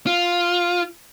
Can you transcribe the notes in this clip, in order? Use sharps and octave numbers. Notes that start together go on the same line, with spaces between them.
F4